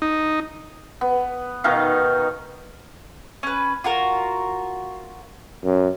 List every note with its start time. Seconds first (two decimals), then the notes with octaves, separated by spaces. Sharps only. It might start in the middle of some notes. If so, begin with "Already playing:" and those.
0.02 D#4
1.01 B3
1.64 B2 D#3 D#4 F5
3.43 C#4 B4
3.84 F4 F#4 A#4
5.64 F#2